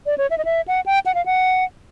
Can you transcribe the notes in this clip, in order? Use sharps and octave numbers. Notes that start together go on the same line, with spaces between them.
D5
C#5
E5
D#5
E5
F#5
G5
F#5
F5
F#5